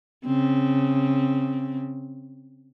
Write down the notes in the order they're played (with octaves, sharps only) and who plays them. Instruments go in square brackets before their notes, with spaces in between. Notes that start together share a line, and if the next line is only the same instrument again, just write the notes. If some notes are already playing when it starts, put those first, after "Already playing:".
[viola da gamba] C#3 C4